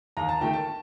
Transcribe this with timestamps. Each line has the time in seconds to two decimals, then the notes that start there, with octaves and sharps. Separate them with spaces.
0.17 D#2 A#5
0.29 A5
0.41 D#3 A3 G5
0.54 A5